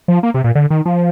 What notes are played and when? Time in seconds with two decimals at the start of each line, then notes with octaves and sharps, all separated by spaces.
0.08 F3
0.23 A#3
0.34 C3
0.44 A#2
0.55 D3
0.70 D#3
0.85 F3